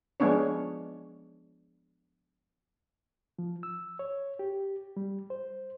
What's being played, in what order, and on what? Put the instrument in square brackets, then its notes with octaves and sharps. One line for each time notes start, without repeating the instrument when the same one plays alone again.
[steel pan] F3 G#3 B3 C#4 D4 C#5
[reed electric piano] F3
E6
C#5
G4
G3
C5